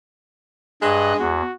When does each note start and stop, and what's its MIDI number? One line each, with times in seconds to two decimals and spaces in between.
0.82 1.13 43
0.82 1.32 56
0.82 1.19 75
0.82 1.13 90
1.20 1.42 40
1.20 1.53 66